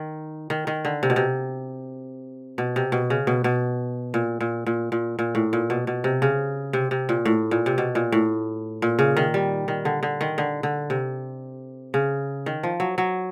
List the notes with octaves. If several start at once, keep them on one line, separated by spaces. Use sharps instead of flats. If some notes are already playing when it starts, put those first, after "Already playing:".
Already playing: D#3
D#3
D#3
D3
C3
B2
C3
B2
C3
B2
C#3
B2
B2
A#2
A#2
A#2
A#2
A#2
A2
A#2
B2
B2
C3
C#3
C3
C3
A#2
A2
A#2
C3
B2
A#2
A2
A#2
C#3
D#3
G3
D#3
D3
D3
D#3
D3
D3
C3
C#3
D#3
F3
F#3
F#3